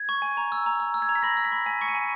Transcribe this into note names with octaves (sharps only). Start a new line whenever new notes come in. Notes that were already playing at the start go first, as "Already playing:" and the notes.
Already playing: G#6
C#6
G#5
A#5
E6
A#5
A#5
E6
G#6
A#5
B6
B5 A#6
E6
B6
B5
G#5 B6
C#6 C#7
D#7
G#5